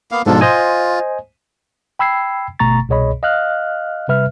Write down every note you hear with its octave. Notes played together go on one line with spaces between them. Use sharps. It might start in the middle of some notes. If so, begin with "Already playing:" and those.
A#3 B3 F5
G#2 B2 F3 D4 F4 A4
F4 C5 D#5 G#5
G5 B5 E6 G#6 C7
G1 B2 A3 A#5 C#6 A6
C2 B2 G#4 C#5 D#5 B5
D#5 F5 F6 F#6
C3 G3 B4 E5 F6